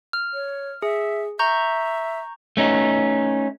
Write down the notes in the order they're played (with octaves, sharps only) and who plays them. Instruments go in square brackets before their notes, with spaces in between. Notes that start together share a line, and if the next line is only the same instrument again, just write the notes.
[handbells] F6
[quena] C#5
[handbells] G#4 [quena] E5
[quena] E5 [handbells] A#5 C#6 G6
[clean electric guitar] A3 C#4 D#4